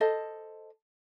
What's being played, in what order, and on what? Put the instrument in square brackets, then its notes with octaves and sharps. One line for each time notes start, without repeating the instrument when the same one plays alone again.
[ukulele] A4 C5 D#5